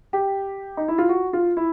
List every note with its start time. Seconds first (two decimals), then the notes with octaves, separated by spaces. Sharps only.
0.13 G4
0.77 D#4
0.88 E4
0.98 F4
1.09 F#4
1.33 F4
1.57 E4